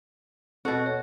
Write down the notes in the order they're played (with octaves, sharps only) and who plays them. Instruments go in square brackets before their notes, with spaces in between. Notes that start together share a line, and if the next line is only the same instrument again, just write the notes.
[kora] B2 F#4 [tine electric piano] C4 A4
[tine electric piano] C#5